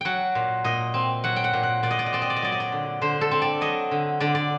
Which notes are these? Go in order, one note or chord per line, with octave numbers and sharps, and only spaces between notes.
F#3 F#5 G5
A#2
A#2 D#5
C4
F#3 F#5
G5
F#5
A#2
F#5
A#2 D5
D#5
D5
D#5
C4 D5
D#5
D5
D#5
F#3 D5
D#5
D5
D3
D3 C5
A4
C4
D5
F#3 D#5
D3
D3 D5
D5